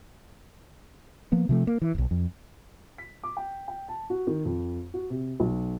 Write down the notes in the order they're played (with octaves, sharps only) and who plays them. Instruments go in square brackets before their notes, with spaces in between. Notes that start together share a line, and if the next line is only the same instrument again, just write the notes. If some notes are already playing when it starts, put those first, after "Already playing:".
[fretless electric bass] F3 A#3 B3
C3 F3 A3
A#3
E3
D1 B1
F2
[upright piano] B6
D6
G5
G5
A5
F#4
D#3
F2
F#4
C3
B1